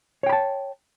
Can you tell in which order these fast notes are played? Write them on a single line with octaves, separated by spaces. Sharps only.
C#5 G5 B5 A5